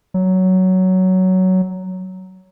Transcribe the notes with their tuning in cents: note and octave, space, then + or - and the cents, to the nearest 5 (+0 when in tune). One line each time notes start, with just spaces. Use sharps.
F#3 +10